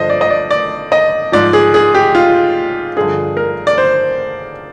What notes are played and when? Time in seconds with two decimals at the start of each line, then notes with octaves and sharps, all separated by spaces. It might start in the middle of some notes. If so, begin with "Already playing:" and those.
Already playing: G2 D3 F3 C5 D#5
0.10 D5
0.21 D#5
0.30 D5
0.51 D5
0.92 D#5
1.32 G#2 F3 D5
1.53 G#4
1.74 G#4
1.95 G4
2.15 F4
2.97 G2 D3 F3 G#4
3.37 A#4
3.67 D5
3.78 C5